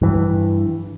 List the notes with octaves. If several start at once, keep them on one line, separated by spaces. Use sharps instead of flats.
G2 E3